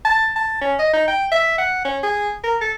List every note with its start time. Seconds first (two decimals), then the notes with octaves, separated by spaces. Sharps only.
0.05 A5
0.36 A5
0.61 C#4
0.79 D#5
0.93 D#4
1.08 G5
1.32 E5
1.58 F#5
1.85 C#4
2.03 G#4
2.43 A#4
2.61 A4